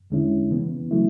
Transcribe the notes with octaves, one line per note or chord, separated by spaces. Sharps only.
E2 D3 G#3 C#4 E4
C#3 E3 B3
C#3 F#3 A3 E4